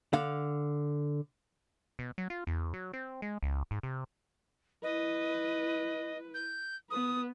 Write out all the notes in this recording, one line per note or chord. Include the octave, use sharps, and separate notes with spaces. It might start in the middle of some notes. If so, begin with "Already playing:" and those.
D3 F5
B2
F#3
F4
E2
F#3
C4
G#3
C#2
G#2
C3
E4 B4 D#5
G6
B3 B4 D#6